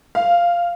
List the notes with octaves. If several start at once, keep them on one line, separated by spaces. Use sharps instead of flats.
F5